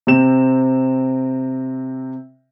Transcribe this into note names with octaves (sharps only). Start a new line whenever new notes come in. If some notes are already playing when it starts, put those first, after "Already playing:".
C3 C4 E7